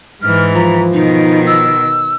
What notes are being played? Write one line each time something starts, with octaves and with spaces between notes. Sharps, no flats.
G#2 E3 F6
F3 A#5
B2 D#3 D#4
E6